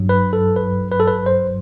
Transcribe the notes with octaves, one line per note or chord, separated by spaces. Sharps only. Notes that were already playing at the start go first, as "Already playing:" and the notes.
Already playing: G2 F#3
B4
A4
B4
B4
A4
B4
C5